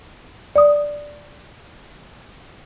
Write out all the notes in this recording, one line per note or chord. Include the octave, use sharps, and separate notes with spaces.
D5 D#6